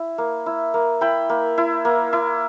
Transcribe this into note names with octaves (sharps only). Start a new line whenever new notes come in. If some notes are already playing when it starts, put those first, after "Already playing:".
Already playing: E4
A#3
E4
A#3
E4 G5 B5
A#3
E4
A#3
E4